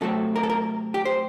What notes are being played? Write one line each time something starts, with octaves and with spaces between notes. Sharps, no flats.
C3 F#3 A3 C4 A4
A#4
A4
A#4
G4
C5